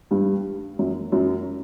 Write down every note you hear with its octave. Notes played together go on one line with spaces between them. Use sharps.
G2 G3
F#2 F#3
F#2 F#3